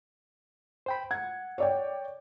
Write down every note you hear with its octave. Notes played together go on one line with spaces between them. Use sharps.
C5 G5 B5
F#5 G#6
C#5 D5 G5